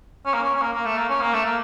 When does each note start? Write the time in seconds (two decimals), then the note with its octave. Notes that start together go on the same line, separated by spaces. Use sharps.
0.26 C#4
0.34 A#3
0.43 C#4
0.56 C#4
0.62 A#3
0.74 A#3
0.86 A3
0.98 A#3
1.09 C#4
1.21 A#3
1.34 A3
1.45 A#3